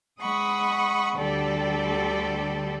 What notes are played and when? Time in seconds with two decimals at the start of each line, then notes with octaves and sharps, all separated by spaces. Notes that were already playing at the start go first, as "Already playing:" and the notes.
0.21 G#3 F#5 B5 C#6 D#6
1.17 D2 D3 G3 G4 A4 D5